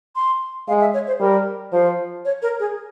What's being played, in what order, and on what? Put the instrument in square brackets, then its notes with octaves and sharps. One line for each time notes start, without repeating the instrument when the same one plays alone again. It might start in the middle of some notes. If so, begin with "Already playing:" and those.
[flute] C6
[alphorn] G#3 [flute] F5
[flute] E5
C#5
C5
[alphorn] G3 [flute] A#4
[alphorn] F3 [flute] C5
[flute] C#5
A#4
G#4